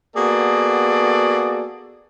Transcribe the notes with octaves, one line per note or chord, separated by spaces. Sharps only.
A#3 B3 F#4 G#4 A4 D5